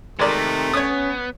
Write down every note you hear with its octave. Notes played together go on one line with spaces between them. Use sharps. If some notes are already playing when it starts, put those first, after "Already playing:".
C3 D#3 G#3 A3 A#4 D5
B3 C#4 C#5 D#6